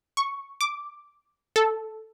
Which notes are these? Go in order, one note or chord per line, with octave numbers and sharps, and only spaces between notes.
C#6
D6
A4